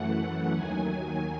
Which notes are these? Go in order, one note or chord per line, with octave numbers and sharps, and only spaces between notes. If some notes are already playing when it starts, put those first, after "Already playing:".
Already playing: F#2 E3 A3 F#5
D#2 D#3 F#3 G#5